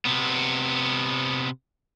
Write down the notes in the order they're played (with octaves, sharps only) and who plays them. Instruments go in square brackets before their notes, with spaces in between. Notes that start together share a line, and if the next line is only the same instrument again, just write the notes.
[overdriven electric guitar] C3 B3